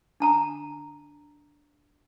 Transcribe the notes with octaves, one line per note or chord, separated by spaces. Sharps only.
D4 A5 A#5